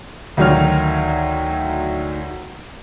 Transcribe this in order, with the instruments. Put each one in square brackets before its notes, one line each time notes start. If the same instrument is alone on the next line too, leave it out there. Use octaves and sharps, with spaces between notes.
[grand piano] D2 D#3 F#3 C#5 F6